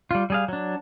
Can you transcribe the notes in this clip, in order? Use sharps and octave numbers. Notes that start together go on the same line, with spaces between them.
G3 F4
G3 G#4 F5
F#3 D4